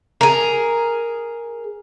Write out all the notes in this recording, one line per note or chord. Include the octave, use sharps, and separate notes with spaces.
G#4 A#4